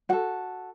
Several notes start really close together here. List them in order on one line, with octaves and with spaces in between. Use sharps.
F#4 F#5 A4